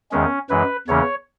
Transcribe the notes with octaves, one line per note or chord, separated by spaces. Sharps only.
E2 D#3 G#3 C#4
F#2 E3 G#3 B4
E2 C#3 E3 A#3 C#4 C#5